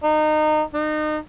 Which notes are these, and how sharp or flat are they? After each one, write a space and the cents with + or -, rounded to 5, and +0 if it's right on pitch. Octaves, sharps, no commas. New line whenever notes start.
D#4 -25
D#4 -30